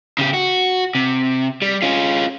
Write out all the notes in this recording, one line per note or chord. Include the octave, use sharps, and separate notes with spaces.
C#3 G4
F#4
C3
G3
C#4 F4